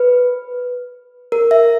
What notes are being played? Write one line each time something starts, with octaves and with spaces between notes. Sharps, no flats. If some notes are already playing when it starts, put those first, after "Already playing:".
Already playing: B4
A#4
E5